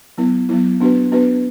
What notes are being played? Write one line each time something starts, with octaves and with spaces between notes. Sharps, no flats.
F#3 B3 E4
F#3 B3 E4
B3 D4 F#4 B4
B3 D4 F#4 B4